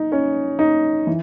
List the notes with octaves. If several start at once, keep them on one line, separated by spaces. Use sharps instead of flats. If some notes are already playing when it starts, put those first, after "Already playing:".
Already playing: D#4
C#4
D#4
E3